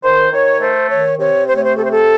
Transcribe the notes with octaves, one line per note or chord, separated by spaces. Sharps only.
D#3 C5
D#3 C#5
A3 C5
D#3 C#5
C3 C#5
A3 C5
C#5
C5
C3 A4
C5
A4